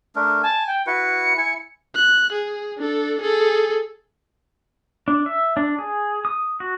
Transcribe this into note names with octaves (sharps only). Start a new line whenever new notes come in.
A3 D4 A#4
G#5 A5
G5
E4 F#4 B4 C#7
E4 G#5
F#6
G#4
D4 A4
G#4 A4
D4
E5
D4
G#4
D#6
F#4